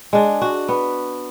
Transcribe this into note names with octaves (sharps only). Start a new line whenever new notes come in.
G#3 D4
F#4
B3